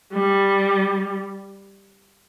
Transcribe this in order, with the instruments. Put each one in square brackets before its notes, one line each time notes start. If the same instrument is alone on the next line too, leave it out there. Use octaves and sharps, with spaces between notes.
[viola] G3